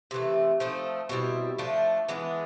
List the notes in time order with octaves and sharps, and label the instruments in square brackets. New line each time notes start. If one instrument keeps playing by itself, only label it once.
[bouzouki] C3 E3 A3
F3 A3 C4 D#4
B2 G3 C4 E4
F3 A3 D4
E3 G#3 B3 D4